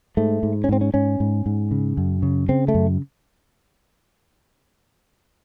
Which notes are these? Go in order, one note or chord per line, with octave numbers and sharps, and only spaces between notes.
G#2 A3
G#2
C#4
G#2 C4
C#4
G#2 C#4
G#2
G#2
C#3
F#2
C#3
C#3 C4
A3
F#2